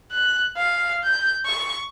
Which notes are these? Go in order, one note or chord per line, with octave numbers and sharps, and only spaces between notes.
F#6
F5
G6
C#6